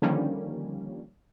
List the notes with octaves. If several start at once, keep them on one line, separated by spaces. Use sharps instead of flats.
D3 D#3 F3 G3 A#3 C#4